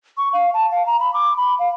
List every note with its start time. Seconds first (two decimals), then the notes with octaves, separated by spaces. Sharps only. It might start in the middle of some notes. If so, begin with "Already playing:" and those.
0.17 C#6
0.33 F5
0.54 A5
0.71 F5
0.87 A#5
1.00 B5
1.14 D6
1.37 B5
1.59 F5